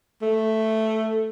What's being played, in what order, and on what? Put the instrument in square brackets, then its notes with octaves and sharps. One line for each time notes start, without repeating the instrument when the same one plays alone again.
[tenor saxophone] A3